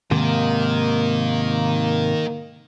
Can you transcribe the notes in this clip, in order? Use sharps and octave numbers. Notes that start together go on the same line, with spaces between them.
G#2 C3 D#3 A#3